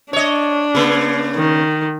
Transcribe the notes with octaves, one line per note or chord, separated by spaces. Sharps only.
D4 C#5 D#5
C#3 A#3
D#3